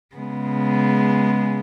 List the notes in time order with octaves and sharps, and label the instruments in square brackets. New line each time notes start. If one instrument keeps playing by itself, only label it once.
[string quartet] C#3 G#3 B3